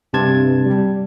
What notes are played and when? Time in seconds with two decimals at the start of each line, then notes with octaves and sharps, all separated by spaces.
0.14 G2 C3 A5 G#6
0.65 G3